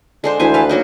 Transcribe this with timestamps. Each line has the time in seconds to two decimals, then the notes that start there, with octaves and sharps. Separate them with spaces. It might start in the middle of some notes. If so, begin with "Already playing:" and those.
0.24 D3 G#3 D4 C5
0.40 D2 E3 C5 G#5
0.54 A4 B4 F5
0.69 F#3 A#3 D#4